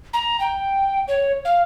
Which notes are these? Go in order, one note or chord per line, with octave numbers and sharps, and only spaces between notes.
A#5
G5
C#5
F5